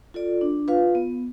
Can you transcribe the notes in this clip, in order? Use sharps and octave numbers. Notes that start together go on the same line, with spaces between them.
F4 A4 D5
D4
F4 B4 F5
B3